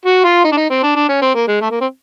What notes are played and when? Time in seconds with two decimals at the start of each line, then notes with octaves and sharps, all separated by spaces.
0.05 F#4
0.24 F4
0.44 D#4
0.52 D4
0.57 D#4
0.70 C4
0.83 D4
0.96 D4
1.08 C#4
1.22 C4
1.34 A#3
1.47 G#3
1.61 A3
1.70 A#3
1.81 C4